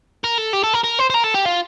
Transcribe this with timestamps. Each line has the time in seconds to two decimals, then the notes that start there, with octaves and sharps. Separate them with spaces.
0.24 A#4
0.38 A4
0.53 G4
0.64 A4
0.74 A#4
0.84 A#4
0.99 C5
1.10 C5
1.14 A#4
1.24 A4
1.34 G4
1.45 F4